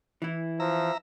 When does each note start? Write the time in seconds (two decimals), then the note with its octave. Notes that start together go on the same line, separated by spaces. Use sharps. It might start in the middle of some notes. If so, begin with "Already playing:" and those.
0.22 E3 E4
0.60 F3 E5 A#5